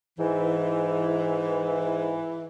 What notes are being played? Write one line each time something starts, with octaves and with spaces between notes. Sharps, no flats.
G#2 E3